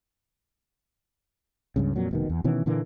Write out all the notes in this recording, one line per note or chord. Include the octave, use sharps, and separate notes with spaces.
C#2 G2 C#3
F2 A#2 F#3
F1 B2 D#3
E2
B2 D#3 E3 C#4
A#2 D3 E3 A#3